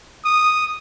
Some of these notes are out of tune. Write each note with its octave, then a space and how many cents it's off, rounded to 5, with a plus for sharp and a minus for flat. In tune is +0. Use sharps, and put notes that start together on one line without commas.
D#6 -5